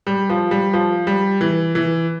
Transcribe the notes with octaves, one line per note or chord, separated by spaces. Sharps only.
G3
F3
G3
F3
G3
E3
E3